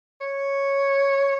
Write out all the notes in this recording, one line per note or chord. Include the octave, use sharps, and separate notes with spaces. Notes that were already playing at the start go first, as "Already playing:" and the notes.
C#5